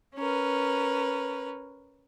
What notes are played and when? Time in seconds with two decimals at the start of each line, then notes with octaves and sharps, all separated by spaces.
0.16 C#4 A#4 B4